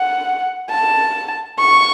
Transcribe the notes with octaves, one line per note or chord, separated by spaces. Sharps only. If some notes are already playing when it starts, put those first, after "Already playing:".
Already playing: F#5
A5
C#6